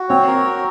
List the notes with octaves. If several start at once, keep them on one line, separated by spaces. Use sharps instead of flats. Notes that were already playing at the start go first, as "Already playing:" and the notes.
Already playing: F#4
C4 C#5
A#4
F#4